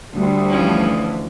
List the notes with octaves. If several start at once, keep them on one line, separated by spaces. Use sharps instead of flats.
D2 G3
E3 F3 C#4